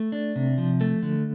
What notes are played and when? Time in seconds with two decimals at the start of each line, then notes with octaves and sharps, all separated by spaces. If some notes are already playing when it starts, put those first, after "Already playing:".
Already playing: A3
0.12 D4
0.36 C3
0.58 F3
0.81 A3
1.02 D3